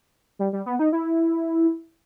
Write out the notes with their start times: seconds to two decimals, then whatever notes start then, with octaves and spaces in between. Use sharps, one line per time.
0.39 G3
0.53 G3
0.66 B3
0.79 D#4
0.92 E4